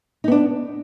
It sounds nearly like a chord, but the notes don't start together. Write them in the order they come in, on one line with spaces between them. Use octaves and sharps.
D#4 B3 D4